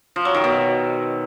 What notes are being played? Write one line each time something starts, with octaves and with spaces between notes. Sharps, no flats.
F3
F#3
D#3
B2